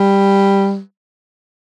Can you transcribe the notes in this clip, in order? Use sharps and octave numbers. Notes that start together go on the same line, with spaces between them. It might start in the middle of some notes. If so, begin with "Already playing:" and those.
Already playing: G3